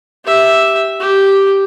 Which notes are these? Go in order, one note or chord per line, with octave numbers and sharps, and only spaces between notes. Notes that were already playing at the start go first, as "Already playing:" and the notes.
G4 E5
G4